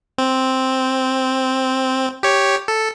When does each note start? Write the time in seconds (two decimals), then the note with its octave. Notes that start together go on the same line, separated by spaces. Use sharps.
0.18 C4
2.23 G4 C#5
2.68 A4